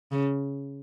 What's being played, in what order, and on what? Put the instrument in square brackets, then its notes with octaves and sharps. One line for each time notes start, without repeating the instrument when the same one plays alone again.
[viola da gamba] C#3